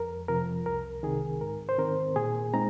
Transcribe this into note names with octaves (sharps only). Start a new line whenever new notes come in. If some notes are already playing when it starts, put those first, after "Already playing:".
Already playing: F2 A#4
C3 F3 A#4
C2 A#4
C3 D#3 G#4
G#2 A#4
C5
D#3 C4 A#4
A#2 G#4
G#3 C4 D#4 A#5